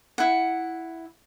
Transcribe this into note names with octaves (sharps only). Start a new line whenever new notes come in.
E4 F#5